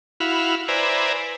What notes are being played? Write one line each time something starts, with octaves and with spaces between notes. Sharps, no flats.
E4 F#4 F5 B5
B4 C5 D5 E5 G#5 A#5